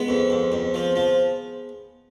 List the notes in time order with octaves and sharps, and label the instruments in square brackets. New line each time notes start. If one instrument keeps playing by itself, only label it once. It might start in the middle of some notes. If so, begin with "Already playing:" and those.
Already playing: [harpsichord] G#3 B3
F2
F2
F2
F3
F3